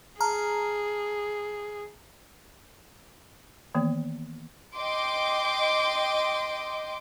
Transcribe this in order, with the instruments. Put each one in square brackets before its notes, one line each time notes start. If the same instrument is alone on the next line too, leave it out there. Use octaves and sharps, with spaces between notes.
[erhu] G#4 [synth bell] A5 A#5 F6
[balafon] D#3 E3 A#3 B3
[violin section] D#5 G5 C6 D6